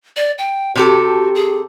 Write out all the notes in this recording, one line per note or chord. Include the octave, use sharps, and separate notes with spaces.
D5
G5
C3 F#4 G4 A4
G#4